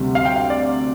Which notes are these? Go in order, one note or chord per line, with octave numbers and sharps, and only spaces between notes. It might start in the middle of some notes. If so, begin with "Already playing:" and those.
Already playing: D2 C3 G3
F5
G5
F5
D5